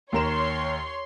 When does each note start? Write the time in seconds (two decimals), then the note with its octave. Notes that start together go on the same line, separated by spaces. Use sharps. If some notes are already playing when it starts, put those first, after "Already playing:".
0.13 D#2 A#4 C#5 C6 E7